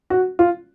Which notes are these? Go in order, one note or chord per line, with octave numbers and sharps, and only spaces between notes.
F#4
F4